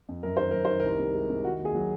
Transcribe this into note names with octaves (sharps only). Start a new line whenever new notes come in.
F2
F#2 A#4
D#3 C5
F#2 A#4
D#3 C5
C2 A#4
C3
G#3
C3
D#3 F#4
D#2
G#4
F#3